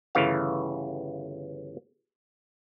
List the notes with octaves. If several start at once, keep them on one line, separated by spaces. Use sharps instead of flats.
G1 C#3 E3 A3 F5